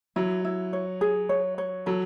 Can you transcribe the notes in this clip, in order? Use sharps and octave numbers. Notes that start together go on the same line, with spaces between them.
F#3 E4
E4
C#5
G#4
C#5
C#5
F#3 A4